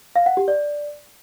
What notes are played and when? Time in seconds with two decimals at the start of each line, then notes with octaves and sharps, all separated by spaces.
0.16 F5
0.26 F#5
0.37 G4
0.48 D5